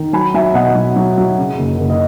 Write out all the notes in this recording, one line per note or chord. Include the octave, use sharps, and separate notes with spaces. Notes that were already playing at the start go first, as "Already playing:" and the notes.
Already playing: D#3
F#3 G#5 B5
F#3 E5 G#5
B2 D#5 F#5
F#3
F#3
F#3
C#3
F#1
F#1
D#5